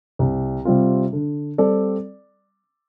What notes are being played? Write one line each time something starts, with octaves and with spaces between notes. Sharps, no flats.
C2
C3 G3 C4 F4
D3
G3 C4 A4 D5